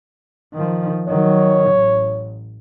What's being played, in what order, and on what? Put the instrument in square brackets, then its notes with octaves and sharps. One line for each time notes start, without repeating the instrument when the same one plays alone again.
[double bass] D#3 F3
[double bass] D#3 F#3 [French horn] C#5
[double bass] A1